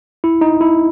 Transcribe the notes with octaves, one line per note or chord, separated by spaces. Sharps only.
E4
D#4
E4